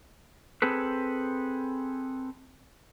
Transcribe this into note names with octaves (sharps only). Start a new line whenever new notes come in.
C4 G#4 A4 B4